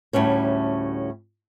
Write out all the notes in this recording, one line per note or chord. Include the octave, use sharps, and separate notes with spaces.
D2 A2 G3 C#4 C#5